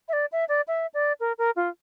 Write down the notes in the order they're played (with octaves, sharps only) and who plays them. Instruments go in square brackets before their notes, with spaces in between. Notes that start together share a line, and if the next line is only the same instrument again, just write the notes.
[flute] E5
D5
E5
D5
E5
D5
A#4
A#4
F4